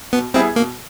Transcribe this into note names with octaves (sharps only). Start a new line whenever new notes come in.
B2 B3
G3 B3 C4 E4 G#4
B2 A#3